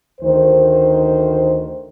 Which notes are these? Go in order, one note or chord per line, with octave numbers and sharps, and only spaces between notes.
D2 D#3 C5